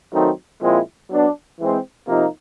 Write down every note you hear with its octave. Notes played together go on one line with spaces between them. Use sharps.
D#3 F#3 A3 C4 D#4
A#2 F3 G#3 C4 E4
F#3 B3 D4
E3 G#3 C4
C3 F3 A#3 D#4